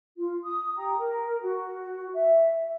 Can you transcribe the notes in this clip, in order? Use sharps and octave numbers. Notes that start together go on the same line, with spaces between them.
F4
D#6
G4 G5 A#5
A#4
F#4
E5